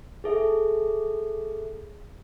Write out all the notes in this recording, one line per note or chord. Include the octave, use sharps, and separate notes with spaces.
G#4 A4 E5